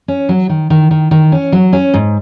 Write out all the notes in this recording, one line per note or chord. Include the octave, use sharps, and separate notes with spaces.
C#4
F#3
D#3
D#3
D#3
D#3
C#4
F#3
C#4
G#2